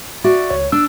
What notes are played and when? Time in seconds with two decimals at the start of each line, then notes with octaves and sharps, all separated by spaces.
0.24 F#4 D5 E5
0.50 C#2 C#5
0.72 D4 E6